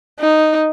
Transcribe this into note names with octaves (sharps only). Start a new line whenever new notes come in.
D#4